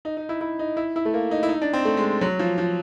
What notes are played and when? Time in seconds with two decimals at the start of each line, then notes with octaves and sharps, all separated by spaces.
0.05 D#4
0.17 D#4
0.29 E4
0.41 E4
0.59 D#4
0.77 E4
0.96 E4
1.05 A3
1.14 A#3
1.31 D#4
1.43 E4
1.49 D#4
1.62 D4
1.73 C4
1.85 A3
1.97 G#3
2.21 F#3
2.39 F3
2.58 F3